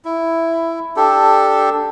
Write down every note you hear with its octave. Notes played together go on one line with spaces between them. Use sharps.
E4
D4 G4 A4